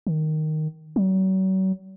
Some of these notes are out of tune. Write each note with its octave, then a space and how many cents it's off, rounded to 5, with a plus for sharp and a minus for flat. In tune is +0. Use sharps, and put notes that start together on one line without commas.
D#3 -5
F#3 +40